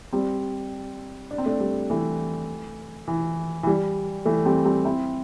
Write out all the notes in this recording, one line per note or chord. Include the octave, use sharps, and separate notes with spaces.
G3 C4
D4
C4
A3 D4
G3
E3 A3
E3
E3
G3
E3 A3
G3 C4
G3 C4
C4 E4